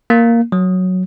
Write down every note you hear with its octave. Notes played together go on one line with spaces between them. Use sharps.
A#3
F#3